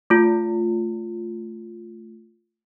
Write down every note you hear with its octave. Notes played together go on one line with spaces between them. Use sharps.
A3 F4